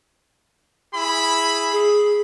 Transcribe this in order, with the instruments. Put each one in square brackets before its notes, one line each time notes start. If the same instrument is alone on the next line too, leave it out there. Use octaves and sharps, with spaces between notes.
[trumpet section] E4 G#4 B5
[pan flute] G#4